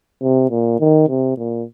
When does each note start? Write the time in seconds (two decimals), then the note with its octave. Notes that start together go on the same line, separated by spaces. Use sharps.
0.22 C3
0.51 A#2
0.80 D#3
1.09 C3
1.37 A#2